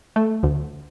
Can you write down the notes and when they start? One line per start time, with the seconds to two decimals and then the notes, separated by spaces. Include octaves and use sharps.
0.16 A3
0.43 D2